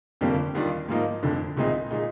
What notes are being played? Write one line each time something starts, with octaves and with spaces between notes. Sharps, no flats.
G1 F2 C3 G3 A#3
D#2 D#3 G3 D4 F4
G#2 F3 A#3 D#4
F1 F2 D3
C2 A#2 G#3 C4 D#4
A#2 G#3 D#4